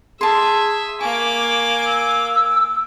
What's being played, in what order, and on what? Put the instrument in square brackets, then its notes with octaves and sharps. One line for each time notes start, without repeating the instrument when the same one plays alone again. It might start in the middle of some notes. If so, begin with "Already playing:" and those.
[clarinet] G#4 [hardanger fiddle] E5 [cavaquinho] A5 C6
[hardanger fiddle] A#3 D6 [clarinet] G#5 [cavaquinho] C#6
[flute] E6